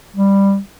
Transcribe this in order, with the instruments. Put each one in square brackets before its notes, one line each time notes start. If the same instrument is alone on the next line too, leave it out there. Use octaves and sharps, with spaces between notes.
[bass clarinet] G3